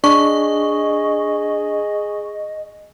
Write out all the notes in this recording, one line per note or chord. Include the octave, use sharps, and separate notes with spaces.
D4 G#4 D#5 C#6